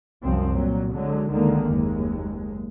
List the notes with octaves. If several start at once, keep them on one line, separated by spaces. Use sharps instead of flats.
C2 F#2 F3 C4
A#2 F#3
D3 F#3 G#3
C#2 D3 D#3 G#3 A#3
F#1 D#2 G#3